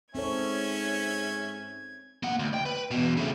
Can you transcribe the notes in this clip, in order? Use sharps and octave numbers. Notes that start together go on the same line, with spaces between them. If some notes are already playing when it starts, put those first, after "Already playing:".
G#2 C4 C#4 A4 C#5 E5 G#6
A#3 F#5
D2
G5
B4
E2 B2
C#3 A3